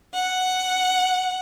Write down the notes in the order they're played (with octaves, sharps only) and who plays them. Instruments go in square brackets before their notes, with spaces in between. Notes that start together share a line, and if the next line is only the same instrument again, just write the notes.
[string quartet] F#5